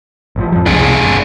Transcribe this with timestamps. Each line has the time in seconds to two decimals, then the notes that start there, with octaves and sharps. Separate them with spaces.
0.36 A1 A2 F3
0.52 F2 F3
0.66 C2 C3 G#3 D4 G#4
1.03 G1